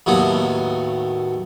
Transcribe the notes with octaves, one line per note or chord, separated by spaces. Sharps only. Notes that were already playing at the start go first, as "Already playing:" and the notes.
D#2 A2 F#3 B3